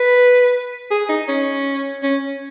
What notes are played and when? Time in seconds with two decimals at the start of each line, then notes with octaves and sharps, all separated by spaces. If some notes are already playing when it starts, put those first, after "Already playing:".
Already playing: B4
0.91 G#4
1.09 D#4
1.28 C#4
2.03 C#4